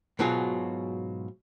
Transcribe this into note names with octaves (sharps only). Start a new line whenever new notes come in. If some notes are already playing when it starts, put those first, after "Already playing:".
G#2 B2 F#3 F4 G#4